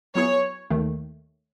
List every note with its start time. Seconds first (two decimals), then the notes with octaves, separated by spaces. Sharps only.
0.15 F#3 B3 E4 G#4 C#5
0.70 D#2 D#3 A3